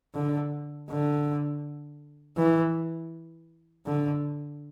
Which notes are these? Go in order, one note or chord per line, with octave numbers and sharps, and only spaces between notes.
D3
D3
E3
D3